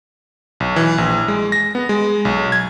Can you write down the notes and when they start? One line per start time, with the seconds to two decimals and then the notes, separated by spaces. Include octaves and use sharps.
0.60 B1
0.76 E3
0.98 A#1
1.28 G#3
1.52 A#6
1.75 B3
1.89 G#3
2.25 B1
2.52 G#6